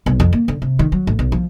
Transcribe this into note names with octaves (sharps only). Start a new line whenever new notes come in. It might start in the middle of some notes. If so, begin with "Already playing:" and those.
B1
F2
A#3
D3
C3
D#3
F#3
A1
B1
F3